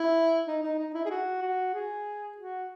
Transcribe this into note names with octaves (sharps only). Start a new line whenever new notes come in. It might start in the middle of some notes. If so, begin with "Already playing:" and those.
Already playing: E4
D#4
D#4
D#4
E4
G#4
F#4
F#4
G#4
F#4